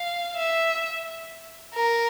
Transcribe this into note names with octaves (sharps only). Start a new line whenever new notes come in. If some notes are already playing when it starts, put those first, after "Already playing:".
Already playing: F5
E5
A#4